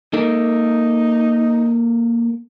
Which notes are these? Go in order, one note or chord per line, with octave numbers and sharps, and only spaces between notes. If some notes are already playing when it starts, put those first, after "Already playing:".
A#3 D#4 A4 A#4